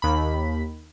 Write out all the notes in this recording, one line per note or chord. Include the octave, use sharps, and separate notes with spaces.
D#2 B5